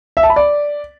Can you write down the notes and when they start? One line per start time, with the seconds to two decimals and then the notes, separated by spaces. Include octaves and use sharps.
0.17 E5
0.23 A5
0.30 B5
0.36 D5